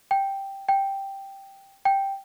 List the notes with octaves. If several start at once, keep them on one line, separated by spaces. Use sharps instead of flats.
G5
G5
G5